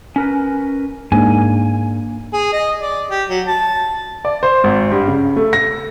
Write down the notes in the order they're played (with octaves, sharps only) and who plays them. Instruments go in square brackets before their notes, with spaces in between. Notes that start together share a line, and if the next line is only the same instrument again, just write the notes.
[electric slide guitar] C#4 A#4 B4
[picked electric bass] G#2 [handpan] A#3 D4 [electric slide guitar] G#5
[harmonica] G#4
D#5
D5
G4
F#3
A5
[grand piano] D5
C5
G#1
G2
C#3
A3
A#6